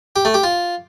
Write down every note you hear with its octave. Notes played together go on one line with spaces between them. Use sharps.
G4
A3
G4
F4